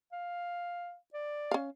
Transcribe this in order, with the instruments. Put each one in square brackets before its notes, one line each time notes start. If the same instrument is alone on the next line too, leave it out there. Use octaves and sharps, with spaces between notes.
[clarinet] F5
D5
[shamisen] C#4 F5